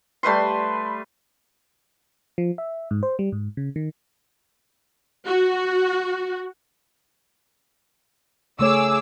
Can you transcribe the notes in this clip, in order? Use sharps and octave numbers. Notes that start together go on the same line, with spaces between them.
G3 A3 B4 C6
F3
E5
G#2
C5
G3
G#2
C#3
D#3
F#4
C#3 A3 G#4 C#5 D6 E6